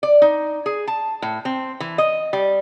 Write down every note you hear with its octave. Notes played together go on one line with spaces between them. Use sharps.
D5
D#4
G#4
A5
A2
C4
E3
D#5
G3